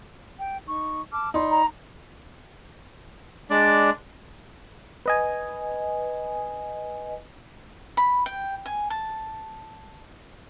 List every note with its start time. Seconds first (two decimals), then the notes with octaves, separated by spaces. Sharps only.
0.39 G5
0.66 D#4 C#6
1.12 A5 D6 F6
1.34 D#4 D5 B5 C6
1.51 A#5
3.50 G#3 D4 D5
5.06 B4 D#5 G#5
7.97 B5
8.26 G5
8.66 G#5
8.90 A5